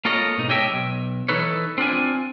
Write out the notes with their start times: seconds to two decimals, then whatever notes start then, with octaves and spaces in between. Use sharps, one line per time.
0.05 A#3 F4 A4 C#5 D#5
0.37 G#2 B2 D#4
0.49 G4 C#5 D#5 E5 G5 A5
0.71 B1
1.28 E3 D#4 A4 B4 C#5
1.78 C4 D4 F4 G#5